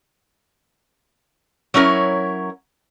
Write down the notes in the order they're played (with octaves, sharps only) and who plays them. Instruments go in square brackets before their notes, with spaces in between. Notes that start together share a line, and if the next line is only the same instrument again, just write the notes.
[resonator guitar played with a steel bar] F#3 C#4 E4 A#4